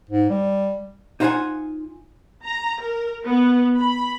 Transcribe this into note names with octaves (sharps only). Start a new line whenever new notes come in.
G#2
G3
D#4 F4 C5 C#5 F#5 G#5
A#5
A#4
B3
B5